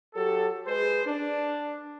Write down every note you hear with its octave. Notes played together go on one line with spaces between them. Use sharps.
F#3 G4 A4
G#3 G#4 B4 C5
D4